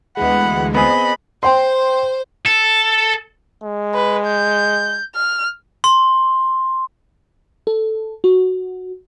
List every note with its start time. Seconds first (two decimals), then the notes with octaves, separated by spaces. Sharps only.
0.17 D2 E3 G#3 B3 F#5 B5
0.75 B3 C4 G#4 D#5 B5
1.43 C5 G5 C6
2.46 A4
3.64 G#3
3.94 B4
4.27 G6
5.15 F6
5.84 C6
7.67 A4
8.24 F#4